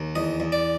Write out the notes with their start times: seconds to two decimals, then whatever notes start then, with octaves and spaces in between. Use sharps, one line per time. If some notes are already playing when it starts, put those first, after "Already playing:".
Already playing: D#2
0.15 E2 D#5
0.40 E2
0.52 D5